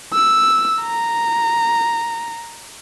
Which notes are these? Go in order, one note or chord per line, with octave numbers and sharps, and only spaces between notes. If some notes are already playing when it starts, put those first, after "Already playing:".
E6
A#5